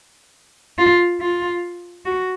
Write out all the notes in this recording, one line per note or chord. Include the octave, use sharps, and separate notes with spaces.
F4
F4
F#4